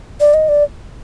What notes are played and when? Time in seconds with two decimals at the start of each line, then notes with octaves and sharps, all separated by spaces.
0.20 D5
0.34 D#5
0.49 D5